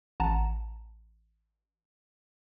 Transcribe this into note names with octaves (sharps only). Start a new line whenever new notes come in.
A1 F#5 A5 A#5